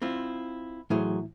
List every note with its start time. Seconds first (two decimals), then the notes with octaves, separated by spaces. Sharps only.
0.02 C4 E4 F4
0.90 A2 E3 F#3 E4 G#4 C5